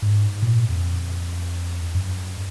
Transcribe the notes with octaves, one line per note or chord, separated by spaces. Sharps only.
G#2
A#2
F2
F#2